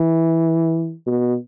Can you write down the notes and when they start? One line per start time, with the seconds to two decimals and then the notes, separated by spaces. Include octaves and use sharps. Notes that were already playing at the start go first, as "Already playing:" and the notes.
Already playing: E3
1.06 B2